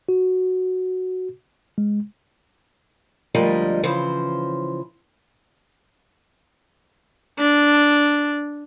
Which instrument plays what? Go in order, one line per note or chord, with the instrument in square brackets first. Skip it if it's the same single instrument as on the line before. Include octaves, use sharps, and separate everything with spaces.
[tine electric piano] F#4
G#3
[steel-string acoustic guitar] D2 F3 G3 G#3 A#4 D#5
C#3 E3 F3 C5
[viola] D4